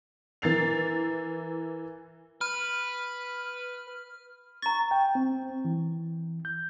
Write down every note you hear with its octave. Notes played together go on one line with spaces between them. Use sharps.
E3 A#4 A6 C7 F7
B4 F6
A#5 C#6 A6
G5
C4
E3
G6